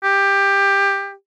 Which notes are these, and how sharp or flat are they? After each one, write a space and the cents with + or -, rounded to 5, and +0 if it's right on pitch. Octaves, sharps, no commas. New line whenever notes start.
G4 +15